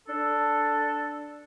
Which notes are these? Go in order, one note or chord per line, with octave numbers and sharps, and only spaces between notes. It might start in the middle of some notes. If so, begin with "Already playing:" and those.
D4 A4